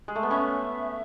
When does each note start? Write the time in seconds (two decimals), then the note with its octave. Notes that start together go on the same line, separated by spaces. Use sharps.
0.08 G#3
0.16 A3
0.23 B3
0.31 C#4 E5